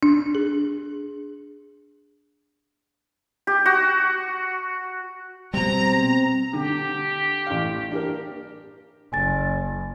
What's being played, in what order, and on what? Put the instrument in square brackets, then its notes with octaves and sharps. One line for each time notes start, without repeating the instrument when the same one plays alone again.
[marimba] D4
G#4
[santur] G4
F#4
[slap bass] B2 G3 [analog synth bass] C4 [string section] A#5
[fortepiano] D3 [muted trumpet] G4
[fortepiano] A1 F5
D4 G4 A#4
[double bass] F#1 [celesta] G#5 A6